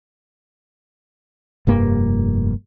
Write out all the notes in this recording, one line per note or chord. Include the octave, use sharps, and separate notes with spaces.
F1 G2 A#3